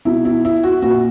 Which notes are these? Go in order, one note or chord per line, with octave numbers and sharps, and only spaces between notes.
B2 E4
E4
E4
F#4
A#2 F#4